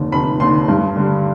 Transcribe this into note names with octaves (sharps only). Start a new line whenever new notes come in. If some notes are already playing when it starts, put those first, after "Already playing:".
Already playing: F1 D#2 D3
F1 B5
D#2 D3 C6
G2
D3 G3